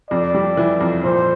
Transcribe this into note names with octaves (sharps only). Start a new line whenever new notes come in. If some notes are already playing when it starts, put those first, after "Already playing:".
F2 D5
G3
E3
F2
A#2 C5